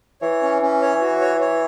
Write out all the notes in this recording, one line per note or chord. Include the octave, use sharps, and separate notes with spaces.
E3 C#5
C#4
C#4
C#5
F#4
C#5
C#5